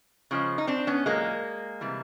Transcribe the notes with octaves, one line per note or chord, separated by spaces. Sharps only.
C#3 F3 G#3
D#4
C4 D4
B3 C#4
A#2 F#3 G#3 A#3
C3 E3 G3